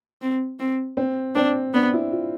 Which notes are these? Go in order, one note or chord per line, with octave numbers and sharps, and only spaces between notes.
C4
C4
C4
C4 D4
B3 D4
E4
F4